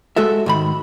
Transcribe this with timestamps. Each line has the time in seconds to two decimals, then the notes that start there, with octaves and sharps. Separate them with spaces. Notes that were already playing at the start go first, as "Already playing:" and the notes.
0.16 G#3 F#4 A4 E5
0.46 G#2 D#3 B5